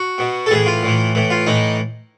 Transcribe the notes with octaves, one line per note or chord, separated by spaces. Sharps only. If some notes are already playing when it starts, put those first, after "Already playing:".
Already playing: F#4
B2
A4
A2 E3 G#4
F4
A2 E3
A2 E3
F4
A2 E3 D#4